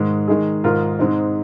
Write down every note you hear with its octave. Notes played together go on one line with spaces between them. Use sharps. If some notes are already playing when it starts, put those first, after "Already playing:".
Already playing: G#2 D#3 G#3
D#3 G#3 D#4 G#4
G#2 D#3 G#3 F4 A#4
G#2 G#3 C4 D#4